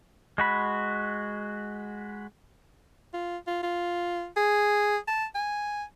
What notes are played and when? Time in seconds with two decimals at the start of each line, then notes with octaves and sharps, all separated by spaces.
0.38 G#3 F#4 B5
3.14 F4
3.47 F4
3.63 F4
4.36 G#4
5.07 A5
5.35 G#5